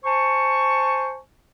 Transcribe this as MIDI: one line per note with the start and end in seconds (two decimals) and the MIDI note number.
0.05 1.17 72
0.05 1.17 80
0.05 1.17 81
0.05 1.17 85